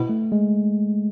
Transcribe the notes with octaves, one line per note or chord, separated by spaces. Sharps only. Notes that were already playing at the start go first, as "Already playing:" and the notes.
Already playing: B2 E4
A3
G#3